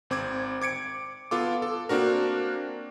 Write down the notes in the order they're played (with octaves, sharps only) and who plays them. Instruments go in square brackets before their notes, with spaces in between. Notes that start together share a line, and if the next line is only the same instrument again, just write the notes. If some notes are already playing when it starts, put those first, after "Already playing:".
[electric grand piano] G#1 C4 D6 G#6
D6 G#6 C#7 D7
B3 F4 A4 D6
A4
A#3 C4 D4 F#4 A#4